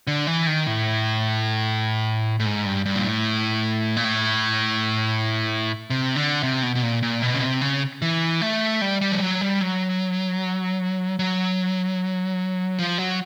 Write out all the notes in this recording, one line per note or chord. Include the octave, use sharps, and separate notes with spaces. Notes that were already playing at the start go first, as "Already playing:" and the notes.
D3
E3
D#3
A2
A2
G#2
G2
G2
A#2
A2
A#2
A2
C3
D3
C3
B2
B2
A#2
A#2
B2
C#3
C3
C#3
E3
A3
G3
G3
F3
F#3
G3
F#3
F#3
F3
F#3